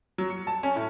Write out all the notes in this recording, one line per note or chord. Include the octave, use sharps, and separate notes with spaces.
F#3
C#7
A5
C#4
A2